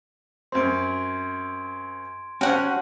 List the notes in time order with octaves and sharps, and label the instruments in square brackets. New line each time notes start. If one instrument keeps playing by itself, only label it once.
[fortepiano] F#2 C4 [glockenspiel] C6 G#6 D7
[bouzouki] F#3 F#5 [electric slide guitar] C#4 [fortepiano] C5 G5 [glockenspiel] A5